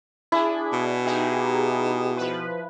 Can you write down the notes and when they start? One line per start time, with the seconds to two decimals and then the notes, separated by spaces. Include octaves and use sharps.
0.32 D4 E4 G#4
0.73 B2
1.05 D#4 G4 G#4
2.17 F3 B4